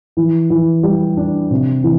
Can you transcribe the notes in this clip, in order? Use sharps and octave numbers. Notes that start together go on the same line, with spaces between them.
E3
E3
G3
D4
C3
E3